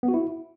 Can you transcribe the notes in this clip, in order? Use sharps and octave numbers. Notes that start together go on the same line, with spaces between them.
B3
F#4
E4